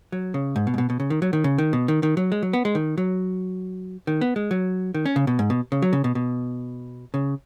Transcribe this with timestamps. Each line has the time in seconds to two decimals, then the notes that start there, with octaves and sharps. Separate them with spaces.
0.12 F#3
0.34 C#3
0.56 G#2
0.67 B2
0.74 G#2
0.78 B2
0.90 B2
1.00 C#3
1.10 D#3
1.22 F#3
1.33 D#3
1.44 C#3
1.58 D#3
1.73 B2
1.88 D#3
2.03 D#3
2.17 F#3
2.32 G#3
2.43 F#3
2.53 B3
2.65 G#3
2.75 D#3
2.98 F#3
4.07 D#3
4.21 B3
4.36 G#3
4.51 F#3
4.94 D#3
5.06 C#4
5.16 C#3
5.27 B2
5.39 G#2
5.50 B2
5.72 C#3
5.82 F#3
5.93 C#3
6.04 B2
6.15 B2
7.14 C#3